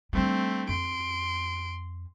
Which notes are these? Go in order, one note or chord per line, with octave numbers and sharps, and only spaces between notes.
G3 A3 C4 D4
F2 C6 D7